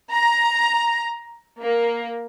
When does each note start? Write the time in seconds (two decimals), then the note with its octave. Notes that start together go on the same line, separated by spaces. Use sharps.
0.11 A#5
1.59 A#3